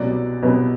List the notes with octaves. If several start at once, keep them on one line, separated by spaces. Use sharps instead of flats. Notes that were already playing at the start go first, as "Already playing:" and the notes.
Already playing: C2 B2 F#3 B3 D5
C2 B2 F#3 B3